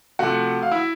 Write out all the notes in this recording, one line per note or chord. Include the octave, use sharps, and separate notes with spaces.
C3 F3 A3 F#4 F#5
F5
E4 E5